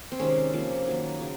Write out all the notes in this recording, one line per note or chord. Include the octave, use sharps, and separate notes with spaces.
C4
C3 D#3 G#3 C#4
C3 F3 A#3
D#3 F#3 A#3
C#3 F#3